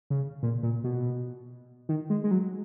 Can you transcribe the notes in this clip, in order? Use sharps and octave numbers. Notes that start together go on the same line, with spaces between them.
C#3
A#2
A#2
B2
D#3
G#3
G#3
F#3